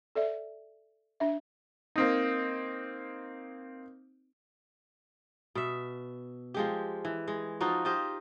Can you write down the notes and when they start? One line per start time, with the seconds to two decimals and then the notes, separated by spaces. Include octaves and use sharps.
0.15 A4 D5 E5
1.20 D4 E5
1.96 A#3 C4 D#4
5.55 B2 E5
6.54 F3 G#3 G4
7.05 E3
7.28 G#3
7.61 F3 D#4 F4 F#4
7.85 F4 G4 C5 D#5